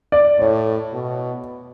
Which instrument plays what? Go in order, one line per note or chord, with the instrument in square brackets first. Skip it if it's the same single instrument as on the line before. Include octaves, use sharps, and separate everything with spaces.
[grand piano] D5
[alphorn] A2 [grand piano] C#5
[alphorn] B2